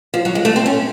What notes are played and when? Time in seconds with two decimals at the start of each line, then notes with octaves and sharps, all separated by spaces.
0.14 F3
0.25 F#3
0.35 G#3
0.45 A3
0.56 C4
0.66 C#4